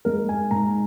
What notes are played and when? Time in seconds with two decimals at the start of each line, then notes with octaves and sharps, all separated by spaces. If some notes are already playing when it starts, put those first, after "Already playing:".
0.05 G#3 A#4
0.29 G#5
0.51 G#2 A#5